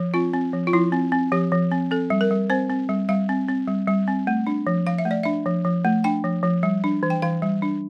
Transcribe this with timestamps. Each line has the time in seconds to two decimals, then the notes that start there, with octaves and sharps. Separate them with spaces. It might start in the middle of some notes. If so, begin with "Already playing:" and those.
Already playing: F3
0.14 C4 F4
0.33 C4
0.53 F3
0.67 F4
0.73 F3 E4
0.92 C4
1.12 C4
1.32 F3 G4
1.52 F3
1.71 C4
1.91 C4 A4
2.10 G3
2.21 A#4
2.31 G3
2.50 C4 C5
2.70 C4
2.89 G3
3.09 G3 F5
3.29 C4
3.48 C4
3.68 G3
3.88 G3
4.07 C4
4.27 A3
4.47 D4
4.67 F3
4.87 F3 F5
4.98 E5
5.05 A3
5.11 D5
5.23 D4 E5
5.46 F3
5.65 F3
5.85 A3
6.04 D4 G5
6.24 F3
6.43 F3
6.63 G3
6.84 D4
7.03 E3
7.10 G5
7.22 E3 F5
7.42 G3
7.62 D4